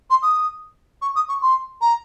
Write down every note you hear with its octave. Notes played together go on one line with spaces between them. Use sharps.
C6
D#6
C#6
D#6
C#6
C6
A#5